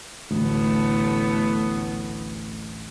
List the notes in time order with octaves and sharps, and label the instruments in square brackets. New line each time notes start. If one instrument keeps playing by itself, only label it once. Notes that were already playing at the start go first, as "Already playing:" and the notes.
[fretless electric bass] A1 D2 [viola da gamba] A2 A3 B3